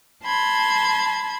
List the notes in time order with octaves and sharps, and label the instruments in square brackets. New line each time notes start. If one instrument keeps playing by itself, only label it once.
[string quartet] A5 B5 C6 G#6